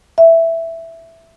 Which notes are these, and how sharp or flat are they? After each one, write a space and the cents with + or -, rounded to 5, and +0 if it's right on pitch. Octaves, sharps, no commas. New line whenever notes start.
E5 +5